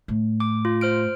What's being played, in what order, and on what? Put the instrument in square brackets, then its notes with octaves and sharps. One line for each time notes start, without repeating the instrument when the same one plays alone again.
[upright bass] A2
[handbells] D6
F4
C5 F6 D7